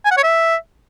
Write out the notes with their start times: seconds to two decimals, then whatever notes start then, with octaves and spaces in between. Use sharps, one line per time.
0.05 G#5
0.11 F#5
0.17 C#5
0.23 E5